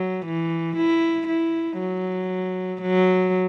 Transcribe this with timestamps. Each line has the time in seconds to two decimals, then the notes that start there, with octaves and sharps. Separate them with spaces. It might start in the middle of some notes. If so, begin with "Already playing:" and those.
Already playing: F#3
0.26 E3
0.77 E4
1.28 E4
1.79 F#3
2.82 F#3